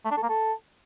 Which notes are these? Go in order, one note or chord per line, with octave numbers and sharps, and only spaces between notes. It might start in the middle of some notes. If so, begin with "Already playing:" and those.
A3
D4
A4
A#3
A4